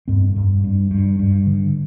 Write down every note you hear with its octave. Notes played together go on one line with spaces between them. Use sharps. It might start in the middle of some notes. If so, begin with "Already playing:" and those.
G2 C4
G2
G2
G2
G2
D3